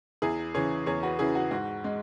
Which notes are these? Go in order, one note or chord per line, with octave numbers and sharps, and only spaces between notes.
E2 E4 G#4
C#3 E3 G#4 C#5
E2 G#4 C#5
F#4 B4
C#3 E3 E4 G#4
F#4
G#2 F#4
G#3